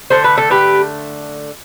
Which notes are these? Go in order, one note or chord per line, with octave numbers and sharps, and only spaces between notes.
D3 A3 C5
B4
A4
G4 B4